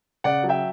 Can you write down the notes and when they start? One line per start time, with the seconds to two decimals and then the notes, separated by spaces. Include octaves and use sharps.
0.24 C#3 D5 F#5
0.44 F#3
0.49 E5 G5